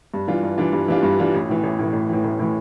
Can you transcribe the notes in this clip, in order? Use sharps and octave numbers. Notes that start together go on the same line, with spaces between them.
G2
E3 G3 D4 F4
G2
E3 G3 D4 F4
G2
E3 G3 D4 F4
G2
E3 G3 D4 F4
A1
A2 E3
A1
A2 E3
A1
A2 E3
A1
A2 E3